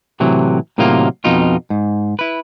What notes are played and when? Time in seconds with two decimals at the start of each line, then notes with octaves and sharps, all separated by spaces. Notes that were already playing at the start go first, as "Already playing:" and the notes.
0.20 A2 C3 E3 F#3
0.78 A2 C3 D#3 F#3 A#3 F4
1.24 F2 B2 D#4 F4
1.70 G#2
2.19 E4 B4